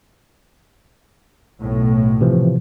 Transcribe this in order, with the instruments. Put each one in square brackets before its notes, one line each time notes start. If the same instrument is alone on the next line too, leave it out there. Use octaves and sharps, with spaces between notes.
[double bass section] B1 A2
[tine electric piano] C3 E3 F3